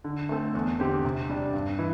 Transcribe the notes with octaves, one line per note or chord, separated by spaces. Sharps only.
D3
A3 C4 A4
E2
D3 C4 G4
C3
G3 D4
G2
E3